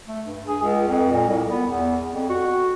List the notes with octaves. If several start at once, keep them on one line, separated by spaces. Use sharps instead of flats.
A3
G2
G#4
C#2
F2
A#2
C2
B3
E2
F2
F#4